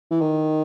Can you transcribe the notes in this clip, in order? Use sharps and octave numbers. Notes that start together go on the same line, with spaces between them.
E3
D#3